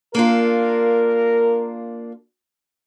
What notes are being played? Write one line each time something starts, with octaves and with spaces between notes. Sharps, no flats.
A#3 D4 F4 A#4